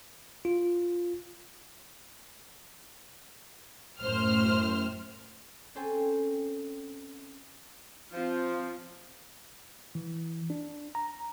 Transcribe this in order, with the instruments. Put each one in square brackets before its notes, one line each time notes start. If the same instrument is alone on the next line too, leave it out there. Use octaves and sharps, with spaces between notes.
[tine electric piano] F4
[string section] F#2 A2 C5 F6
[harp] C4 C#4 A4 C5 G5 G#5
[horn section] F3 [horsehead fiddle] C4 F4
[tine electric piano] E3
D4
A#5